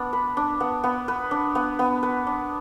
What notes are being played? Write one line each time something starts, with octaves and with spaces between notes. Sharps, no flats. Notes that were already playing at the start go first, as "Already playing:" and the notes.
Already playing: B3 D4
B4
D4
B3
B3
B4
D4
B3
B3
B4
D4